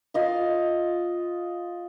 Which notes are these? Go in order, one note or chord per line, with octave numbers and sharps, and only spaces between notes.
F4 D#5 F5